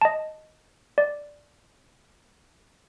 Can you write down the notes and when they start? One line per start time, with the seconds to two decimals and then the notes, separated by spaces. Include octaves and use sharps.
0.01 D#5 A5
0.98 D5